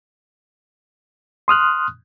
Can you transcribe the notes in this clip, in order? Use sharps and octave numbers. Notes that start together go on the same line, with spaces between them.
C6 D#6 F6 F#6